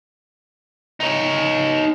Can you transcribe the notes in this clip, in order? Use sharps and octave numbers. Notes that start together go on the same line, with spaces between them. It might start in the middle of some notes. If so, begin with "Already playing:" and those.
D#4 C#5